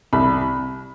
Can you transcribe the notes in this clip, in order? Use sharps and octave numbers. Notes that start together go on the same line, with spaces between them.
C2 B5